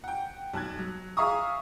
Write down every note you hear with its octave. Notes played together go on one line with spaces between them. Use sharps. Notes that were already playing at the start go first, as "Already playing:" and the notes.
F#5 G5
B1 A5 F#6 G#6
F#3
G#4 E5 F5 A#5 C#6 D#6